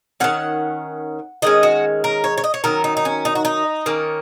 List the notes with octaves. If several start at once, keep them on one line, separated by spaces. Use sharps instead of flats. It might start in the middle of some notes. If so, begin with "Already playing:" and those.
D#3 G#3 C#4 F#5
D#3 G#3 C#4 D#5
F#4
A#4
C#5
C#5
D#5
C#5
D#3 F#3 C#4 A#4
D#4
D#4
C#4
D#4
F#4
D#4
D#3 A#3 C#4